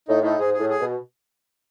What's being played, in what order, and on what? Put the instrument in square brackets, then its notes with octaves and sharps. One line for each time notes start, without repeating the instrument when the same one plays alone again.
[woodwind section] A2 [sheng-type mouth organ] D#4
[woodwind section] A2 [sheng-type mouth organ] D#4
[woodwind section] G#2 [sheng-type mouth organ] G#4
[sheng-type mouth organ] G#4
[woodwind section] A2
[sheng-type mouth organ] G#4
[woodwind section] B2